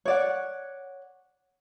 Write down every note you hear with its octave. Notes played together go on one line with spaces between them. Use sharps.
C#5 D5 F#5